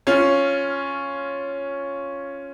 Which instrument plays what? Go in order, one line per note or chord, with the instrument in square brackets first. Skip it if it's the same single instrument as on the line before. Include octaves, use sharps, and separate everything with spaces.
[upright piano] C#4 F4